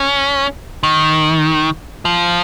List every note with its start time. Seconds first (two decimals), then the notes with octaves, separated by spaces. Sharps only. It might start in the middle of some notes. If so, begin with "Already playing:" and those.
Already playing: C#4
0.83 D#3
2.05 F3